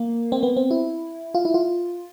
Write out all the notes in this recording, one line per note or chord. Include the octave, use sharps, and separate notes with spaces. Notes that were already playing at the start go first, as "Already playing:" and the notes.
Already playing: A#3
C4
B3
C4
E4
F4
E4
F4